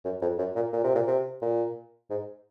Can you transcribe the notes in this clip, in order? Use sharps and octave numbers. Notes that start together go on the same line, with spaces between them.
F#2
F2
F#2
A#2
A#2
C3
A#2
C3
A#2
G#2